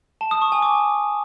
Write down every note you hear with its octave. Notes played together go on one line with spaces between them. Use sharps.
A5
D#6
C#6
G#5
D6